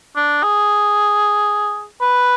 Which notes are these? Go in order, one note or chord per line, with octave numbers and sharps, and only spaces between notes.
D4
G#4
B4